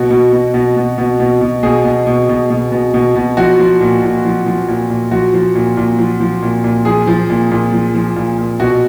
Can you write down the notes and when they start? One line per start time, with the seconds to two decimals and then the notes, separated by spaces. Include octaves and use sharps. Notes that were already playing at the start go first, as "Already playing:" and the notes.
Already playing: B2 F#4
0.11 B2
0.33 B2
0.54 B2
0.76 B2
0.98 B2
1.20 B2
1.41 B2
1.63 B2 G#4
1.85 B2
2.07 B2
2.29 B2
2.50 B2
2.72 B2
2.94 B2
3.15 B2
3.37 F3 F#4
3.59 F3
3.81 A#2
4.02 A#2
4.25 F3
4.46 F3
4.68 A#2
4.90 A#2
5.11 F3 F#4
5.33 F3
5.55 A#2
5.77 A#2
5.98 F3
6.20 F3
6.42 A#2
6.64 A#2
6.85 F3 G#4
7.07 F3
7.30 A#2
7.51 A#2
7.73 F3
7.95 F3
8.16 A#2
8.38 A#2
8.60 B2 F#4